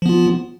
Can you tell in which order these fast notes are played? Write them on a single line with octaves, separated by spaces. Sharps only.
F3 B3 F4